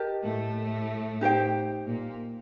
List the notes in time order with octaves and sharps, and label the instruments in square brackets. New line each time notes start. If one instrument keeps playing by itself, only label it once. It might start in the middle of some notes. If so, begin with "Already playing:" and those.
Already playing: [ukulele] G4 A#4 D#5 A5
[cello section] A2 A3
[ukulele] D#4 G4 C5 G5
[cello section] A#2 A#3